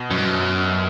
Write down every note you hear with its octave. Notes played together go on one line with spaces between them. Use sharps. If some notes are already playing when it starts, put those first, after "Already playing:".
Already playing: B2
F#2
G2
F#2